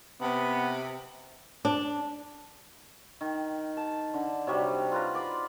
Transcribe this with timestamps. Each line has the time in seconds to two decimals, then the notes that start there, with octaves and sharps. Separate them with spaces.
0.21 C3 B3
1.65 D4
3.21 D#3
3.77 A5
4.14 D3
4.47 C3 F#3 G3
4.92 F4 B4 A#5
5.15 D5 B5 C6